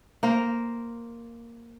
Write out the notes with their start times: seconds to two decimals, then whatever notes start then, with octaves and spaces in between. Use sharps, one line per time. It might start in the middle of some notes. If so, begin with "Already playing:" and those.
0.23 A#3 A#4 C5 F5